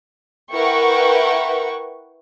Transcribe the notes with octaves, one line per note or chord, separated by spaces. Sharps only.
E4 A#4 B4 F#5 G5 C#6